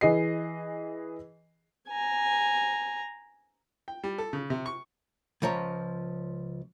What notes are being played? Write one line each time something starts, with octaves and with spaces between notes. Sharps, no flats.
E3 G#4 D#5 C7
G#5 A#5
G5
G3
A4
C#3
C3
C#6
C#2 F3 C#5 A#5